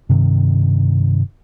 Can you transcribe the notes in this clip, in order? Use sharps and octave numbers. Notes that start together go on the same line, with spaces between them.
G2 C3 D#3